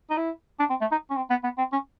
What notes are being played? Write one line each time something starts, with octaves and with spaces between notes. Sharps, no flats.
D#4
E4
D4
C4
A3
D#4
C#4
C4
B3
B3
C4
C#4